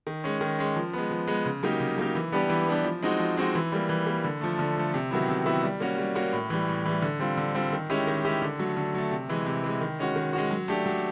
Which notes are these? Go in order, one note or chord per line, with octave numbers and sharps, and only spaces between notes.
D#3
G#3 C#4
D#3
G#3 C#4
F3
G#3 B3
F3
G#3 B3
C#3
F#3 A#3 D#4 G4
C#3
F#3 A#3 D#4 G4
E3
G3 B3 D4 G4
E3
G3 B3 D4 G4
F3
G#3 C4 D#4 F#4
F3
G#3 C4 D#4 F#4
E3
G3 A#3
E3
G3 A#3
D3
F3 A3
D3
F3 A3
C3
D#3 F#3 B3 E4
C3
D#3 F#3 B3 E4
G3
A#3 C#4 F#4
G3
A#3 C#4 F#4
A2
E3 G3
A2
E3 G3
D3
G3 C4 F4
D3
G3 C4 F4
D#3
G#3 C#4 E4 G4
D#3
G#3 C#4 E4 G4
D3
F#3 A3
D3
F#3 A3
C3
E3 G#3
C3
E3 G#3
D#3
G#3 C#4 F#4
D#3
G#3 C#4 F#4
F#3
A3 D4 G4
F#3